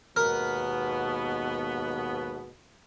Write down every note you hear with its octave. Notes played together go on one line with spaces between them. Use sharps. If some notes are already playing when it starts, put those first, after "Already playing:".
D#2 G#2 B2 B3 A#4